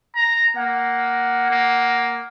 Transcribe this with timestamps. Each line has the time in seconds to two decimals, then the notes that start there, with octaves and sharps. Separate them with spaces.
0.16 A#5
0.56 A#3 F#5
1.50 A#3